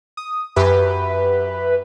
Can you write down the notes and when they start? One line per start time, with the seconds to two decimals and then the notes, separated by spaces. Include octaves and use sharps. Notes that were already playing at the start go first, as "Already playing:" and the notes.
0.17 D#6
0.56 F#2 G4 B4 E5